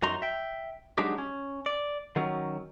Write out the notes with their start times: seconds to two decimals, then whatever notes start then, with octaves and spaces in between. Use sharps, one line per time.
0.03 F#2 D#4 F#4 A#5 C6
0.22 E5 G5
0.98 F#3 G#3 D4 D#4 F#4 G4
1.18 C#4
1.66 D5
2.16 D#3 F#3 C#4